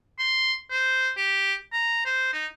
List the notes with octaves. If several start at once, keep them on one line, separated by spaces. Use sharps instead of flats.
C6
C5
G4
A#5
C5
D#4